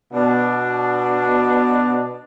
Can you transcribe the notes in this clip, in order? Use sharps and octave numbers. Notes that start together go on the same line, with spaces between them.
B2 D4